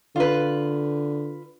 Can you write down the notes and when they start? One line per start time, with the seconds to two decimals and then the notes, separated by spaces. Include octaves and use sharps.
0.16 D3 F4 B4